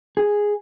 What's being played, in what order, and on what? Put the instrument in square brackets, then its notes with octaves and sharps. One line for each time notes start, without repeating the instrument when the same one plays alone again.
[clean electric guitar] G#4